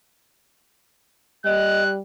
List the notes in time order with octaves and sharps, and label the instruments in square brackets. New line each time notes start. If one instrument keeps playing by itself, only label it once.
[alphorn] G3 [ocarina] D#5 [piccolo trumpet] F#6